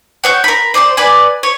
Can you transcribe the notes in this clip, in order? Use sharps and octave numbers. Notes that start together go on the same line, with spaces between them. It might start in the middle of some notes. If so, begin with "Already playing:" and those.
F#4 C#5 G6
A#4 B5
C5 D5 G#5 C6
B4 D5 G#5
C#5